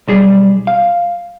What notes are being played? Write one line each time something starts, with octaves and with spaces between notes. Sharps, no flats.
B1 G3 G#4
F5